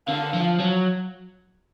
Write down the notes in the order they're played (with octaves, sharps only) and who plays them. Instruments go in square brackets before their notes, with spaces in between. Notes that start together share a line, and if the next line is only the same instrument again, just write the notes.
[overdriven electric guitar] D3 [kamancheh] F5
[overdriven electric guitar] F3
F#3